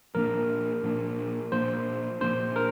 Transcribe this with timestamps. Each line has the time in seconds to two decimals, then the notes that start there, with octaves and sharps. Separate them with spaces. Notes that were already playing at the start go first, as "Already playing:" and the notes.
0.15 A#2 F3 A#3 D4 A#4
0.83 A#2 F3 A#3 D4
1.52 A#2 F3 A#3 D4 C5
2.21 A#2 F3 A#3 D4 C5
2.56 A#4